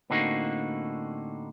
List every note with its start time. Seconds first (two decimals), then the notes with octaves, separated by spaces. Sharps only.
0.10 A2 D3 A#3 C4 D#4 F#4